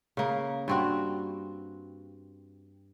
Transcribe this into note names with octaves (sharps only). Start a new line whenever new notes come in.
C#3 A#3
G2 C4 F#4